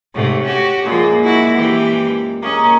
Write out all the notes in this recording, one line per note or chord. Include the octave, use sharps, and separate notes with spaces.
G#2 C3 A3 C#5
C#4 F#4 G4
F#2 A#2 F3 G#3 A#3 F4
E4 F#4
E3 G4
A#3 C#4 A#4 D#5